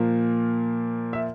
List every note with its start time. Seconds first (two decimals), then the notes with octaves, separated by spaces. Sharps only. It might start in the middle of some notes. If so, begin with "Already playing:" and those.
Already playing: A#2 F3 A#3
1.13 E5